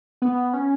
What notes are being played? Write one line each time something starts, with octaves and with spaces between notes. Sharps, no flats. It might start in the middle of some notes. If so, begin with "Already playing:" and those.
B3
C#4